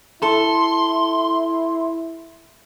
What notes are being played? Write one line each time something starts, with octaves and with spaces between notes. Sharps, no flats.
E4 A4 C6